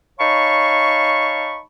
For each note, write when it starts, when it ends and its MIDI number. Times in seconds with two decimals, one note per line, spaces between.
0.18 1.59 63
0.18 1.59 73
0.18 1.59 77
0.18 1.59 81
0.18 1.59 83
0.18 1.59 85